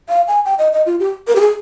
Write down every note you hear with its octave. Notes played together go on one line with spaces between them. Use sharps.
F5
G#5
G5
D#5
D#5
F4
G4
A#4
G4
G#4